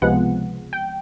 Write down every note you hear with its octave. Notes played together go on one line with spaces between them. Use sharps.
C#2 C3 F3 G#3 B3 F#5
G5